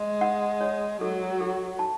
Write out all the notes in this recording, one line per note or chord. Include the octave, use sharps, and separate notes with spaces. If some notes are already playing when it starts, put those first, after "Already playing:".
Already playing: G#3
F#5
C#5
F#3 A4
A4
A5